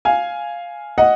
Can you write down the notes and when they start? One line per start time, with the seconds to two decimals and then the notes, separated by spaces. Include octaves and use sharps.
0.05 F5 G#5
0.98 D#5 F#5